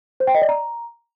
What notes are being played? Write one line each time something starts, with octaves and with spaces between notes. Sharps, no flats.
C5
G5
D#5
D5
A#5